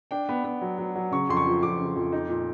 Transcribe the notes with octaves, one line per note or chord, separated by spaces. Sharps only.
D4 G5
B3
B3
F#3
F#3
F#3
C#3 C#6
F2 C6
C#6
F3
F2 D6
C#3
F2
D#4
A#2